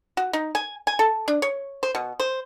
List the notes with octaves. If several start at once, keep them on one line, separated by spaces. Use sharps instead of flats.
F#4
D#4
G#5
G#5
A4
D4
C#5
C5
B2
C5